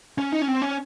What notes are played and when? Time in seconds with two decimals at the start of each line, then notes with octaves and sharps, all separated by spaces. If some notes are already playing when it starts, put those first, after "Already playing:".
0.18 C#4
0.32 D#4
0.42 C#4
0.48 C4
0.62 C#4